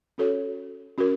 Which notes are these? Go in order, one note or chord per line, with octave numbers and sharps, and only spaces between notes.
C#4 F#4 A4 C#5
C#4 F#4 A#4